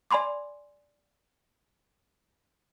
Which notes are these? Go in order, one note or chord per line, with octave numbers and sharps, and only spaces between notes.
D5 G#5 B5 C6 D6